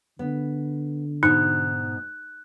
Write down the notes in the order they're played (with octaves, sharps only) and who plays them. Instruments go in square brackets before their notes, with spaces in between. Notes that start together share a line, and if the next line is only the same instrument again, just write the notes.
[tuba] D3 [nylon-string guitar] B3
[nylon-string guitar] G#2 B2 [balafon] D#4 [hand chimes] F#6